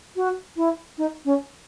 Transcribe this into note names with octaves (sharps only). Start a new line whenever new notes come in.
F#4
E4
D#4
C#4